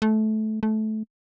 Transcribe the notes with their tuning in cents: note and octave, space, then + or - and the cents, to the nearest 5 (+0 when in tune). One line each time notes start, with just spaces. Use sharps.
A3 -20
A3 -20